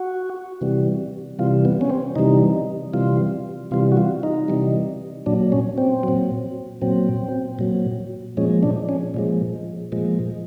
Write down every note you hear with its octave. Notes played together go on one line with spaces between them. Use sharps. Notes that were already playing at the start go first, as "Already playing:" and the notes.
Already playing: F#4
C3 E3 G3
C3 E3 G3 F4
B3
C#4
C4
C3 E3 G3 D#4
C3 E3 G3 F4
C3 E3 G3 F4
F#4
F4
D#4
C3 E3 G3
A#2 F#3 D4
C#4
C4
A#2 F#3
A#2 F#3 C4
A#2 F#3
A#2 F3 G#3 C#4
D4
C#4
A#2 F3 G#3
A#2 F3 G#3